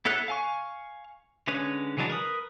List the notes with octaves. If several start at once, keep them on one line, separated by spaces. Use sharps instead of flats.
B3 E4 A4 C#5 F#6
F5 G#5 C#6
D3 G#3 C#4 B4 C#5
C#3 E3 F#3 G#3 D4
A#4 B4 D#6